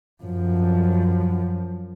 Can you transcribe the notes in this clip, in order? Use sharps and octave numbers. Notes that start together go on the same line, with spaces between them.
F#2 F3